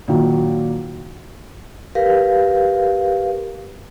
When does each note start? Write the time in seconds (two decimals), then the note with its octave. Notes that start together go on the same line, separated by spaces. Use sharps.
0.08 A#2 D#3 F#3
1.95 G4 A#4 B4 F5